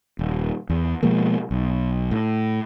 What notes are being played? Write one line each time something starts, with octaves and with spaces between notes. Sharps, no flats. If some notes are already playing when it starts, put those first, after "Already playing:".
D#1
E2
B2 F3 G#3 A#3
B1
A2